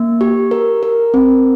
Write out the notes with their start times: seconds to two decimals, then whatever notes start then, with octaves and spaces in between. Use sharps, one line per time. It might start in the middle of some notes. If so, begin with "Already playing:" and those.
Already playing: A#3
0.21 G4
0.51 A#4
0.83 A#4
1.14 C4